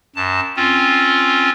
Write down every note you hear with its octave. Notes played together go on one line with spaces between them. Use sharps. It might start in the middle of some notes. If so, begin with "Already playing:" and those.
F#2 A5
C4 C#4 F4